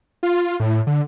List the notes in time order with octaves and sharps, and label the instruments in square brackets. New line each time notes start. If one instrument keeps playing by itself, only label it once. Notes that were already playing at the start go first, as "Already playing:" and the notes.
[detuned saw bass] F4
A2
D3